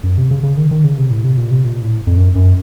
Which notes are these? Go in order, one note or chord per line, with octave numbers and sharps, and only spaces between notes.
F#2
C3
C#3
C#3
D#3
D#3
C#3
C3
A2
C3
A#2
C3
A#2
A2
F2
F#2
F#2